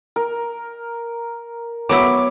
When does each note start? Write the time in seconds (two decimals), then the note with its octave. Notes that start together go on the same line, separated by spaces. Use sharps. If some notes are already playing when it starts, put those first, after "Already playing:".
0.16 A#4
1.89 F#3 B3 E4 C#5 D6